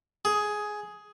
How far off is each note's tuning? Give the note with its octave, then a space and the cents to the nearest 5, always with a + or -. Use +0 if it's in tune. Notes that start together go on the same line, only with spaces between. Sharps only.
G#4 +10